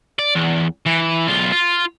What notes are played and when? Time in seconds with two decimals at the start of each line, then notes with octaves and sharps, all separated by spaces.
0.19 D5
0.35 E2
0.86 E3
1.28 B1 F4
1.52 F4